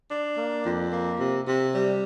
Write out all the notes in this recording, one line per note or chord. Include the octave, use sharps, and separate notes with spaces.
D4
A#3
F2
A#3
C3
C3
G3